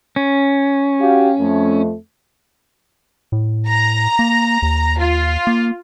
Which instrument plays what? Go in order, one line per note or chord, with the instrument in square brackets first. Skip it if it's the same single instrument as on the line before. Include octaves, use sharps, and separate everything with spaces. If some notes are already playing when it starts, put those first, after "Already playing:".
[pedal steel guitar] C#4
[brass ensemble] F#4 G4 F5
F2 A3
[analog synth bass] A2
[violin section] A#5
[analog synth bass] A#3
D#2
[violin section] F4
[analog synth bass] A#3